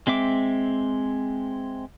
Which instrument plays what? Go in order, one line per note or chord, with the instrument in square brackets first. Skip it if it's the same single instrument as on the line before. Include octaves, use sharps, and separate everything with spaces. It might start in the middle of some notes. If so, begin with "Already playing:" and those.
[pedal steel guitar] G#3 C4 E5 D6